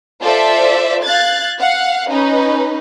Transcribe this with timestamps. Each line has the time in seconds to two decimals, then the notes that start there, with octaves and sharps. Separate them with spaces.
0.21 F4 A4 C5 D5 E5
1.04 F5 F#6 G#6 A6
1.59 F5 F#5
2.10 C#4 D#4 B4